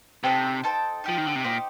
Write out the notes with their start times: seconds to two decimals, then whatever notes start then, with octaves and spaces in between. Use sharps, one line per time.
0.24 C3 D#4 A4 C5 G5
0.64 D#4 A4 C5 G5
1.04 F3 D#4 G4 C5
1.18 D#3
1.27 D3
1.35 C3
1.44 A#2 D#4 G4 C5